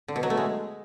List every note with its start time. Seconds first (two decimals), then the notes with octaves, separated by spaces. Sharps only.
0.08 D3
0.16 B2
0.23 F#3
0.30 A3
0.37 G#3